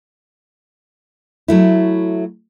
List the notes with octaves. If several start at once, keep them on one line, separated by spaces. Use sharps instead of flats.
F#3 A3 E4